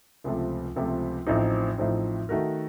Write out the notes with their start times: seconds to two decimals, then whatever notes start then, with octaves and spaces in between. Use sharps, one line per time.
0.24 C#2 C3 F3 A3
0.76 C#2 C3 F3 A3
1.27 A1 A2 F3 C4 D#4
1.78 A1 A2 F3 C4 D#4
2.29 D#3 A3 D#4 F#4 A#4